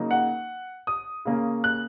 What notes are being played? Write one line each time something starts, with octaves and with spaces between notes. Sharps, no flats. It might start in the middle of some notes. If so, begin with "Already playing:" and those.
Already playing: C#3 F#3 A#3 D#4
F#5
D#6
C#3 A#3 C#4
F#6